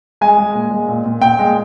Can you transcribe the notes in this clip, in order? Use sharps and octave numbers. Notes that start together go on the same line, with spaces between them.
G#3 G#5
G#3
A#2
G#3
A#2
A#2
A#2 G5
G#3